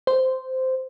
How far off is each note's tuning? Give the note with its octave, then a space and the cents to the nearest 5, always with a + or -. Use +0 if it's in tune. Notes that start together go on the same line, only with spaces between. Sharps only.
C5 -10